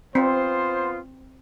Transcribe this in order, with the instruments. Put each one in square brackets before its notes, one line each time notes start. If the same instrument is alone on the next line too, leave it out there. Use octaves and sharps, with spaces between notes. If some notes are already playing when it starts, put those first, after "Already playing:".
[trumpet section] B3 F4 C5 [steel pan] C4